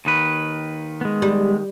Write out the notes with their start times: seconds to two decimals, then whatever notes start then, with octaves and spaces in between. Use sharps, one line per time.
0.05 D#2 D#3 B4
1.01 G#3 B3
1.22 G3